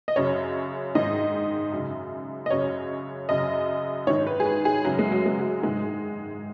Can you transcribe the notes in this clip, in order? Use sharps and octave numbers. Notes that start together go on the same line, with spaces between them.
D#5
F#2 C#3 C#5
G#2 D#3 D#5
F#2
C#3
D#5
F#2 C#3 C#5
F#2 C#3 D#5
G#2 D#3 C#5
B4
G#4
B4
G#4
F#2 C#3 F#3
G#3
F#3
G#3
F#3
G#2 D#3 G#3